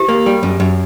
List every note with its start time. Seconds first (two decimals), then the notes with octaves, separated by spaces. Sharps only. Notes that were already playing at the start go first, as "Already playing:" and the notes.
Already playing: G4
0.09 A#3
0.26 G3
0.43 F#2
0.60 F#2